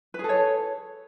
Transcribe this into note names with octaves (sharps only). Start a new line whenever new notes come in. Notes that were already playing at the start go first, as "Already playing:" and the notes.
G#4 A4 B4 C#5